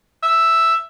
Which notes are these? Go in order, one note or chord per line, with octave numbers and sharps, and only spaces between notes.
E5